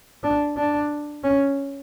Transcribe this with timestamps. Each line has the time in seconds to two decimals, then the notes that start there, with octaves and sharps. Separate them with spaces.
0.23 D4
0.57 D4
1.24 C#4